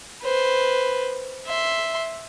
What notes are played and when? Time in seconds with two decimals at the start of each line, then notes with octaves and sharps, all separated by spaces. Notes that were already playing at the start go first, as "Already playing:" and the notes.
0.23 B4 C5
1.47 E5 C6